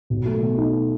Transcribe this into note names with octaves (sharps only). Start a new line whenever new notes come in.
B1
A3
B2
D#4